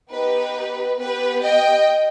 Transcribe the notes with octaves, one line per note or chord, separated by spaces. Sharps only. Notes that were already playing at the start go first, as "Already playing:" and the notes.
B3 D#4 G4 B4
B3 G4 B4
D#5 G5